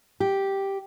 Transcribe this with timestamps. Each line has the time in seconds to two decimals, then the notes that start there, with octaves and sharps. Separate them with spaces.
0.20 G4